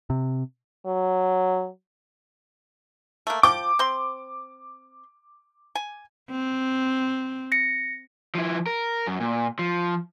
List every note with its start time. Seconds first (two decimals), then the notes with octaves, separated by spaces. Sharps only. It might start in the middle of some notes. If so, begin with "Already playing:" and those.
0.10 C3
0.86 F#3
3.27 A3 A#3
3.43 F3 G5 D6
3.79 C4 C6
5.75 G#5
6.30 C4
7.52 A#6 C#7
8.35 F3 E4
8.67 A#4
9.07 F#2
9.20 A#2
9.59 F3